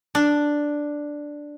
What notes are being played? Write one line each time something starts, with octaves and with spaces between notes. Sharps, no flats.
D4